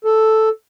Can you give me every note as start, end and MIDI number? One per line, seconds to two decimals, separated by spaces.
0.05 0.49 69